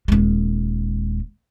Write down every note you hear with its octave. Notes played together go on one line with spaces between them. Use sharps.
D#1 G#3